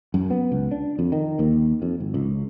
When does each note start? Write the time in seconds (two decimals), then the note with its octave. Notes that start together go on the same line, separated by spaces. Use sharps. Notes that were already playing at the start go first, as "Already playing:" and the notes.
0.14 F#2
0.30 B3
0.52 C#2
0.71 D4
0.99 F2
1.12 D#3
1.39 D#2
1.82 F2
2.00 G#1
2.14 C#2